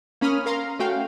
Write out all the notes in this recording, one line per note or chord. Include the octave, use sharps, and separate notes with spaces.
A#3 C#4 B5 D#6 F6
A#4 F5 A#5 C6
A3 C#4 F#4 F5 G5